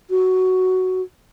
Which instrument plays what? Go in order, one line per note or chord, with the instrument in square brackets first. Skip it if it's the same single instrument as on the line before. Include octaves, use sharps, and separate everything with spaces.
[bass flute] F#4